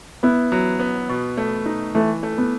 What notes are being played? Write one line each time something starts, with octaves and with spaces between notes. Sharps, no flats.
B3 E4
F#3
B3
B2
A3
D#4
E3 A3
A3
B3